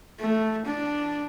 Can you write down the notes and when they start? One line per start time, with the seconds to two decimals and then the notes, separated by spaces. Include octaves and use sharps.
0.20 A3
0.65 D4